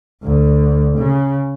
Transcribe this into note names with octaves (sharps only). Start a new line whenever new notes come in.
D2
C#3